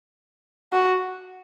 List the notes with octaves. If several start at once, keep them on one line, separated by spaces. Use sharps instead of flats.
F#4